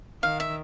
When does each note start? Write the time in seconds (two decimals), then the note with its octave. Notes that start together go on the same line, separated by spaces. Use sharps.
0.23 D#3 F5
0.40 E5